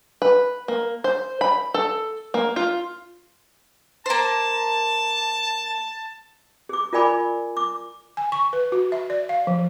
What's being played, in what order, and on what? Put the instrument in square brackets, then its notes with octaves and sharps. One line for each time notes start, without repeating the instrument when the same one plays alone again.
[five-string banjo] B4
A#3
C5
B5
A4
A#3
F4
[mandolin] A#3 C5 [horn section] A5
[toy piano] G#4 D6
F4 A#4 D5 G#5 B5 D6
D6
[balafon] G#5
C#6
B4
F#4
E5
D5
F5
F3